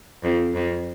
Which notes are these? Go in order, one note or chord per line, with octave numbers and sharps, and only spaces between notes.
F2
F2